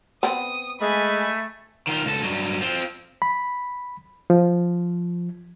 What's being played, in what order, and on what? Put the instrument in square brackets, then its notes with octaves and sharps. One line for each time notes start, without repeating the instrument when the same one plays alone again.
[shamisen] B3 C4 [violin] D#6
[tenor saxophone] G#3 [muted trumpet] A3 [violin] G#5 B5
[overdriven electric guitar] D#3 F4
C#2 A4
G2 F#3
C4 F4
[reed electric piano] B5
F3